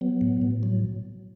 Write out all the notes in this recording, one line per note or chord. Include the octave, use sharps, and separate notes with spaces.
F#3 B3
A2
A2
F#3